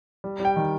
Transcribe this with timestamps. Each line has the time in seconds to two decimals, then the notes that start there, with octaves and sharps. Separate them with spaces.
0.24 G3
0.40 G3 G5
0.56 D#3